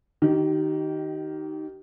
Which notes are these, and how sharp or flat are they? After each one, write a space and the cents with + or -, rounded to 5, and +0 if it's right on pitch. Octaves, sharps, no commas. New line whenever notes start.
D#3 +0 G4 -35